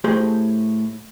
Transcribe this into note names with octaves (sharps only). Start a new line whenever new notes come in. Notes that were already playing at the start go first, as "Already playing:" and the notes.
A2 A3 G4 G#4 C5 C6